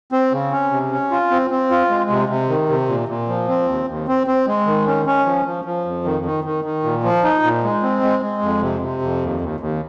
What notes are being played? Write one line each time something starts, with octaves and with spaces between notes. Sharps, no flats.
C4
C#3
C#4
C3
C#4
F4
C4
C4
F4
G#3
C3
C3
D#3
C3
A#2
A#2
F3
C4
D#2
D#2
C4
C4
G#3
D#3
C#4
C#4
F3
F3
F3
F2
D#3
D#3
D#3
D#3
A#2
F3
D#4
A#2
G#3
C4
G#3
G#3
F2
C3
C3
F2
D#2
D#2
D#2